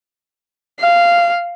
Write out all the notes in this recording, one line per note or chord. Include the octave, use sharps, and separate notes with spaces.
F5